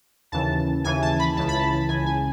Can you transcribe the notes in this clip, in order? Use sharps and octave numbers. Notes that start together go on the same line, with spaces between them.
D#2 C#3 E3 A5
D#2 C#3 E3 G#5
A5
B5
C#2 C#3 E3 A5
B5
A5
C#2 C#3 E3 G#5
G#5